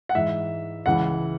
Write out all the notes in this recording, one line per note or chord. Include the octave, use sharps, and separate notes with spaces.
F#5
G#2 E3 E5
C#2 C#3 E3 F#5